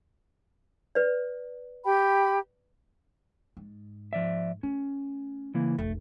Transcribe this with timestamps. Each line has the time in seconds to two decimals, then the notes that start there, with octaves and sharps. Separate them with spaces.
0.95 B4 D5
1.85 G4 G5 B5
3.57 G#2
4.13 F3 D5 E5
4.63 A3 C#4
5.54 C#3 E3 A#3
5.78 F1 B1 A3